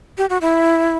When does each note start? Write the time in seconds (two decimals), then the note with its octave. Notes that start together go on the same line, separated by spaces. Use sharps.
0.18 G4
0.30 F#4
0.41 E4